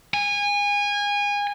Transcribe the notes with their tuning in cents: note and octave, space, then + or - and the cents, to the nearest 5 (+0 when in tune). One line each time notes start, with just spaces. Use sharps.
G#5 -25